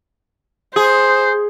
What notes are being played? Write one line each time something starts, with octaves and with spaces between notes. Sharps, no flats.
G#4 C5